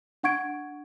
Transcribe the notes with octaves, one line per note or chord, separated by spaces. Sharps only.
D4 F#5 C#6 G#6 D7